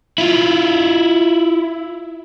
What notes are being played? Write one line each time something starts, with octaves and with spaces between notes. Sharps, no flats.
E4 F4